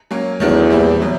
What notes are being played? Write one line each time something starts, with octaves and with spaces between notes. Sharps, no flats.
F#3 A#3 C#4
E2 D#3 F#3 A3 D4
A#2 G3 C4 E4 G4
B2 F#3